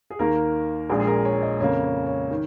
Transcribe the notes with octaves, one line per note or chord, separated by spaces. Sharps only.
G#4
D#2 D#3 A#3 A#4
A#1 A#2 G#3 G#4
G#4
A#4
C#5
D#5
F2 C#3 A#3 C#5
C#5
C#5
D#3